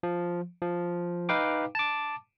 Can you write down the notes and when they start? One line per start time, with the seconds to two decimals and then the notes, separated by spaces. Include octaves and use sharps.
0.03 F3
0.62 F3
1.29 D#4 B4 F5 G5 D6
1.75 A5 D6